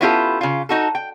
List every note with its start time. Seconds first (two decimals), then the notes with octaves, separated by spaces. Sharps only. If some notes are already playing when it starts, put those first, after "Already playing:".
0.01 B3 C#4 E4 F4 G4 A4
0.41 C#3 F4
0.69 D#4 F#4 A4
0.95 G5